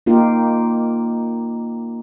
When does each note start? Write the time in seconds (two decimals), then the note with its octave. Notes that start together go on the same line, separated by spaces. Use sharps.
0.06 A#3 D#4 F4 G4